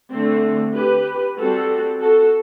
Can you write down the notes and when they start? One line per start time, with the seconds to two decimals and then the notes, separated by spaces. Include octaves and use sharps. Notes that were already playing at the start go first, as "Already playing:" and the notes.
0.10 D3 A3 C4
0.74 G4 B4
1.37 G3 C4 F#4 A4
2.00 F#4 A4